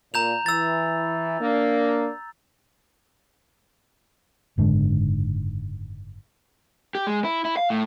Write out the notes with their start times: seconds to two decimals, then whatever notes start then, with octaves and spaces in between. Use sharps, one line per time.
0.14 A#2 A#5 G6 F7
0.46 E3 E6 A6
1.41 A#3 D4
4.58 F#1 G#2 D3
6.95 G4
7.07 G#3
7.24 E4
7.45 E4
7.57 F5
7.70 A2